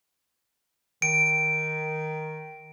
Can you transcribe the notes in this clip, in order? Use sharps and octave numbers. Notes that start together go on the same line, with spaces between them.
D#3 D7